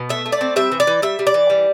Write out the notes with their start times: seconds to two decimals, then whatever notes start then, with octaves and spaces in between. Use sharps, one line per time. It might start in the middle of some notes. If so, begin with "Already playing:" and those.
Already playing: B2
0.09 A3 E5
0.26 A3
0.32 D5
0.41 C4
0.56 G3 E5
0.72 E3
0.80 D5
0.87 E3
1.02 G3 E5
1.19 G3
1.27 D5
1.34 E3
1.50 G3